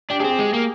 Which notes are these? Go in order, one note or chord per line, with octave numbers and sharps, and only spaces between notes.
D4 G4
C4 D4 G#4
G4
G#3
A#3